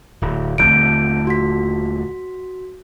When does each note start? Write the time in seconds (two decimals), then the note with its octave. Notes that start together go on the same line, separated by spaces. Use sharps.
0.22 D1
0.58 D#1 D3 A3 C4 G6 D7
1.27 F#4 B6